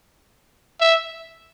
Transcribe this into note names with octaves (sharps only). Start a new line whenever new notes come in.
E5